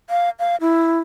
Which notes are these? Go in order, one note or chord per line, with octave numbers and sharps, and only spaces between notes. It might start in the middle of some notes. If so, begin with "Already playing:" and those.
F5
F5
E4